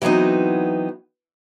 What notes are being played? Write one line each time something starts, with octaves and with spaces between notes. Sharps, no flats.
E3 F#3 B3 C4 D#4